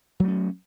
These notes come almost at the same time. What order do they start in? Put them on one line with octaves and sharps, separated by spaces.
F#3 A3 C#4